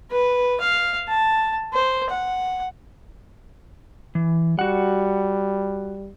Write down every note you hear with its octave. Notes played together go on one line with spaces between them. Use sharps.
B4
F5
A5
C5
F#5
E3
G3 F#4 F#5